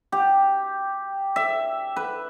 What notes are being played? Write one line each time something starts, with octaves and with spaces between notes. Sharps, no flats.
G4
E5
B4